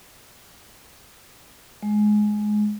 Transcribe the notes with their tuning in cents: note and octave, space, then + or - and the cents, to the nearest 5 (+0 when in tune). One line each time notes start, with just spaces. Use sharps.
G#3 +15